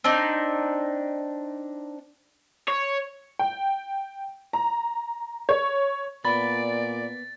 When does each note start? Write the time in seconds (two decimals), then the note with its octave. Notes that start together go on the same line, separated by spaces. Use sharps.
0.04 C4 D4 D#4 D5
2.68 C#5
3.39 G5
4.53 A#5
5.49 C#5
6.25 A#2 B3 D5 B5 A6